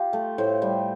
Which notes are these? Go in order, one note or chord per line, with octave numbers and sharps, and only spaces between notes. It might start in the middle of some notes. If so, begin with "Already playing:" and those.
Already playing: F4 G4
A3
A2 C5
G3